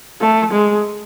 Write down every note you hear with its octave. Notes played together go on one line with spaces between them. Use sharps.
A3
G#3